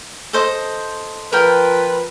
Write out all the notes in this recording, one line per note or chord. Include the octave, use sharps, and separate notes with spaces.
A4 C5 D#5
F3 A#4 B4 G5